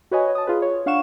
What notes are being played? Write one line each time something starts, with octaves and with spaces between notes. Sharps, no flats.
F#4 B4 C#5 D#5 G#5
A5 D#6
F4 G#4 B4
C#5
D4 F5 F#5 C#6 E7